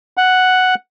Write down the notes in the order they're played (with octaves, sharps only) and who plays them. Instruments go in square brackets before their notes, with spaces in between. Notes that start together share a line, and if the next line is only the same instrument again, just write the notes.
[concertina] F#5